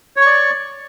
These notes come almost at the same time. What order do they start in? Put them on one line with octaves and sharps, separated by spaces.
C#5 C#6 D5